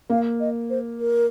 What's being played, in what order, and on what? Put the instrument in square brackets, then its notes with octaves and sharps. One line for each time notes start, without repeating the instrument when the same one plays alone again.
[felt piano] A#3 [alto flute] F5
[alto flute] D#5
C5
A#4